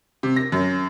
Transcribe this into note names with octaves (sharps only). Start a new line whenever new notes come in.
C3
A#6
F#2